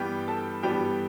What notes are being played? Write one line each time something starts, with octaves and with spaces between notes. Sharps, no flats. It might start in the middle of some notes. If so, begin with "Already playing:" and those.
Already playing: G2 E3 G3 B3 G4 G5
A4 A5
G2 E3 G3 B3 G4 G5